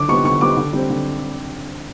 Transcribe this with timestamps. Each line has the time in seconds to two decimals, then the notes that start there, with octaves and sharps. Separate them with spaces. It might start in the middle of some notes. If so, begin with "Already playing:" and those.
Already playing: D3 D6
0.08 G3 B3 C#6
0.24 D3 C#6
0.41 G3 B3 D6
0.57 D3
0.73 G3 C4
0.90 D3